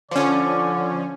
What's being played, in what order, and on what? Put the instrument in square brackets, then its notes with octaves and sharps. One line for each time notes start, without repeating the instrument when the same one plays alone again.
[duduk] D3 [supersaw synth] F3 C#4 [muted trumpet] D5